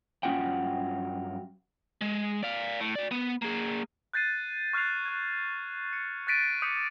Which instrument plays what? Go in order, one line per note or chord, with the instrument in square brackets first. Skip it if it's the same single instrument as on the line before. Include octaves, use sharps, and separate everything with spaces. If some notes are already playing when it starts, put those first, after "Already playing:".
[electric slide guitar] G2 F#3 C#4 F4 F#5 G5
[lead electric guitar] G#3
D5 F5
A2
F#4 D5
B3
A#3 G#4
[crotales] F#6 G6 A6 C7 D#7
C#6 F6 F#6 G#6 C7 F7
F#6 G#6
C#7
F#6 G6 A6 B6 D7 D#7
D6 D#6 G6 B6 C#7